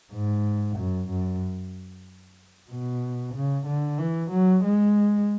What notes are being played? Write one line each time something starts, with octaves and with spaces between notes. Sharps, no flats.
G#2
F#2
F#2
B2
C#3
D3
E3
F#3
G#3